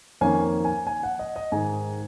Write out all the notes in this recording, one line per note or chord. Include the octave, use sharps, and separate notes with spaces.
F2 D#3 A#3 C#4 G#5
G#5
G#5
F#5
D#5
D#5
G#2 D#3 G#3 G#5